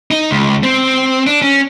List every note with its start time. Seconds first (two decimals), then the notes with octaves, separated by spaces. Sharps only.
0.11 D#4
0.31 C#2
0.63 C4
1.27 D4
1.42 C#4